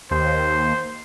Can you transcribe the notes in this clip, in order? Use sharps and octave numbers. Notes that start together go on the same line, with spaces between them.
D#2 C5